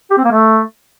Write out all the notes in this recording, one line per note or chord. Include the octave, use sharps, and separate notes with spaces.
G4
C4
A#3
A3